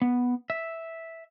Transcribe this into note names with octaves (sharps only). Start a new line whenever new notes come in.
B3
E5